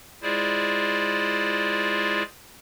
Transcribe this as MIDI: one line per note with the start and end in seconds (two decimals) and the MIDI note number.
0.22 2.23 56
0.22 2.23 64
0.22 2.23 65
0.22 2.23 68
0.22 2.23 72
0.22 2.23 74